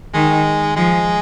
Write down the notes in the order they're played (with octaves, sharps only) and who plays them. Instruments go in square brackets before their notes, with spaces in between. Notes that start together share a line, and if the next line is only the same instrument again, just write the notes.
[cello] D#3 [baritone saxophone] G#3
[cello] F3 [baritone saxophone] G#3